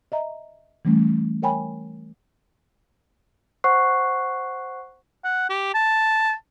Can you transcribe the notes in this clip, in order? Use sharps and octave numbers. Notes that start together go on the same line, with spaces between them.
D#5 E5 A#5
E3 G3 A3 C#4
A#4 C#5 G5 G#5 B5
C5 F#5 C#6 F#6 C7
F#5
G4
A5